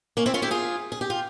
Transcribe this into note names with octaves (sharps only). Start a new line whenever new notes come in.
A#3 C#4
C4 E4
C#4 F4
E4 G4
F4 G#4
G#4
G4
F4